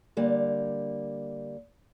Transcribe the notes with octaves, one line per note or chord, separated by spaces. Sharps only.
D3 G3 A#3